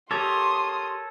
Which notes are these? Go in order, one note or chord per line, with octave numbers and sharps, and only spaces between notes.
G4 A4 A#4 C#5 C6 D6 D#6